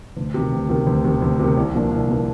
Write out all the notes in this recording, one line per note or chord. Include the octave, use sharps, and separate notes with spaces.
D2
C3 D#3
D2
C3 D#3
D2
C3 D#3
D2
C3 D#3
C2
A#2 F3 A#3 D4
C2
A#2 F3 A#3 D4